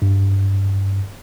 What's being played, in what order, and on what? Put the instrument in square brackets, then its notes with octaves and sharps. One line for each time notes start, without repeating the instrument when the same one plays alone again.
[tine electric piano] G2